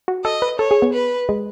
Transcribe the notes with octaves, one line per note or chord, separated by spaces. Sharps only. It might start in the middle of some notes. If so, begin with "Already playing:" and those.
F#4
A4 D#5
B4
A4 C#5
G#4
B3
B4
G#3